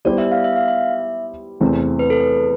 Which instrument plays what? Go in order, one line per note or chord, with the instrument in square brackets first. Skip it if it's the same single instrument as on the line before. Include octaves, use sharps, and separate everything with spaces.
[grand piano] G3 B3 E4 G4 C5 [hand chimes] D5
[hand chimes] E5
F5
E5
F5
E5
[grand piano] E2 C3 E3 A3 C4
[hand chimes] B4
A4
B4